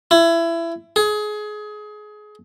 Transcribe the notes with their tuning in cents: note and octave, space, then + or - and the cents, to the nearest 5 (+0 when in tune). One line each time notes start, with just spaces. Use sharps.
E4 +25
G#4 +25